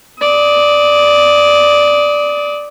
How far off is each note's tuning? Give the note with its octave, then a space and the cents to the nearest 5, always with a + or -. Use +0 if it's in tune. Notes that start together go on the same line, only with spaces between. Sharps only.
D5 +0 D#6 +25